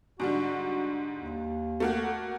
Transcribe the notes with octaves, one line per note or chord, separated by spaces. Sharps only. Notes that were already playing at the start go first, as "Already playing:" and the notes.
G#2 D3 G3 F#4
D#2
A3 A#3 F#4